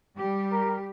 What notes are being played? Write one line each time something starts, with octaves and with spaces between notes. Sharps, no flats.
G3 G4
A#4